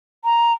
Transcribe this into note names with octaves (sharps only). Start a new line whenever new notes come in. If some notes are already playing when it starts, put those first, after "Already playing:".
A#5